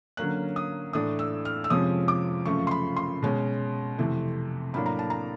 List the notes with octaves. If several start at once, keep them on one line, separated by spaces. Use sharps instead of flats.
D3 F#3 A#3 C#4 F#6
D#6
A2 E3 A3 D4 D#6
E6
F6
E6
F2 C3 F3 G#3 C#4 D#6
D6
F#2 C#3 F3 A3 C#6
C6
B5
C6
B2 G#3 C#4
F2 C3 E3 A3
A2 F#3 A#3 D4 B5
A#5
A5
A#5